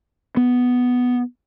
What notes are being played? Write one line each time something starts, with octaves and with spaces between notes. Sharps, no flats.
B3